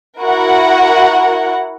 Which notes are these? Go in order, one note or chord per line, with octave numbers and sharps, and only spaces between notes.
E4 F#4 A#4 F#5